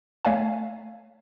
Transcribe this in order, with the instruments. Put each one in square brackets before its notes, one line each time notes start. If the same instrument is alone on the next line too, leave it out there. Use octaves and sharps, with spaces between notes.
[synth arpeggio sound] A3 C#5 E5 F5 G#5